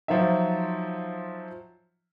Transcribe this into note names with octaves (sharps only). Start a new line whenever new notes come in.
F3 F#3 D#4 F4 E5